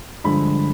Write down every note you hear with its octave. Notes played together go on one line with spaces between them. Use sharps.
G2 D3 F3 G#3 B5